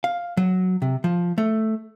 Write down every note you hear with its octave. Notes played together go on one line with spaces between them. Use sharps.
F5
F#3
C3
F3
A3